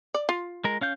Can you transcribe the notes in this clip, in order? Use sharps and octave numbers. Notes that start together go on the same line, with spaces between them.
D5
F4
G#3 A#4
C#4 F5 G6